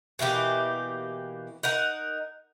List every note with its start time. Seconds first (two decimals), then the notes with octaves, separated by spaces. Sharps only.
0.19 B2 E3 A#3 G4
1.63 D#4 A#4 F#5